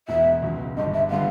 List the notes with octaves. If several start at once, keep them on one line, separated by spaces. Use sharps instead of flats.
E1 E2 B2 G#3 B3 E5
C#2 B2 F#3
G1 G2 D3 D#5
E5
D3 G3 B3 F5